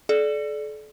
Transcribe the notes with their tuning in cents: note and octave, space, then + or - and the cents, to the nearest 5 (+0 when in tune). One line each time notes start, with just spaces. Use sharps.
A4 -40 D5 +0